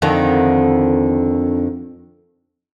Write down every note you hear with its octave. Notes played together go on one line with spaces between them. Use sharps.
F2 D3 D#3